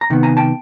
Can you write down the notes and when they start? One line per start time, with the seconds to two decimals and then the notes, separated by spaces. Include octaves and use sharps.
0.01 A#5
0.10 C3 D#3 B3
0.23 G#5 A#5
0.37 G5 A5